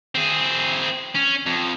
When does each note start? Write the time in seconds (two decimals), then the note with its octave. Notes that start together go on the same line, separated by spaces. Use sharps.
0.15 C4 G#4
1.15 C#4
1.46 F2